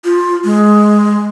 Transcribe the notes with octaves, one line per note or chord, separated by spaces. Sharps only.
F4
G#3